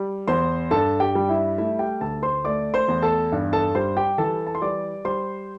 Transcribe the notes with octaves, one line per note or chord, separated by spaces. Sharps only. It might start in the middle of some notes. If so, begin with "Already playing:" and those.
Already playing: G3
E2 C5 C6
G2 A4 A5
G4 G5
G3
E4 E5
A3 E4 E5
G4 G5
D2 A4 A5
C5 C6
A3 D5 D6
C5 C6
E2
A4 A5
G2
A4 A5
G3 C5 C6
G4 G5
E3 A4 A5
A5
C6
G3 D5 D6
G3 C5 C6